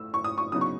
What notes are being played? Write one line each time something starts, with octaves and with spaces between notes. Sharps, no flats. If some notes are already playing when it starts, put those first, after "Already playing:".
Already playing: A2 E6
C#6
D#6
C#6
C#3 F#3 B3 D#4 D#6
C#6